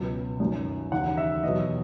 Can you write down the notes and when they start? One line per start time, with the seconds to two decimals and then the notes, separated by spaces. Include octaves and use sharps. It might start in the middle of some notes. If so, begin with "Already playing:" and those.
Already playing: C#2 B2 F#3
0.40 F#2 D#3 F#3
0.92 D#2 C#3 E3 F#5
1.17 E5
1.43 E2 B2 F#3 D#5